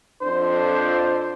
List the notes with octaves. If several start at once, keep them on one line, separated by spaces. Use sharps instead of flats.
F2 D4 C5